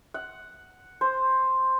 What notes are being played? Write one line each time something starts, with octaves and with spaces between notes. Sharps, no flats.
F#5
C5